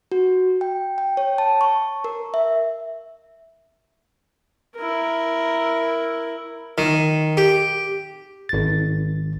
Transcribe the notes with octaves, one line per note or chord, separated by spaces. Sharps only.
F#4
G5
G5
C#5
A5
C#6
A#4
E5
E4 A#4
D#3
G4
G#1 A6